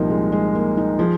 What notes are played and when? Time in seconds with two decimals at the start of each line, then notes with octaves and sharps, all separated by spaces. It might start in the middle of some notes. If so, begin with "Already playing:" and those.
Already playing: C2 A#2 F3 A#3 D#4
0.10 G#3
0.32 G#3
0.55 A#3
0.77 D#4
0.99 F3 G#4